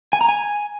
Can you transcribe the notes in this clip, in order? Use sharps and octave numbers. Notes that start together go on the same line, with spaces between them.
G#5
A#5
G#5